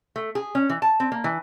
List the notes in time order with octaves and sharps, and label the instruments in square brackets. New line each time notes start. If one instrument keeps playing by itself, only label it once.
[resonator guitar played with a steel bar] A3
G#4
C#4
E3
A5
C4
A#3
E3